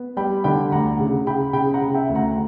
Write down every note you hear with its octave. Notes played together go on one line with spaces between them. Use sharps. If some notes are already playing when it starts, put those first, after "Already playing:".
Already playing: B3
G3 G5 B5
D3 G5 B5
D2 F#5 A#5
C#3
C#3 G5 B5
C#3 G5 B5
F#5 A#5
C#3
E5 G5
D2
F#5 A#5